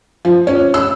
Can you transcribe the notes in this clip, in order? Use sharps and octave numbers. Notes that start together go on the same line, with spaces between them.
F3
C#4
E6